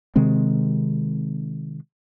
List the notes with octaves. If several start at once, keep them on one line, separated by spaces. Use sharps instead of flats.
C3 D#3 G#3 C4